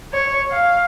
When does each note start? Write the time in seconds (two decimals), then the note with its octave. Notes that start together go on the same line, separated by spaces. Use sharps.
0.13 C#5
0.51 F5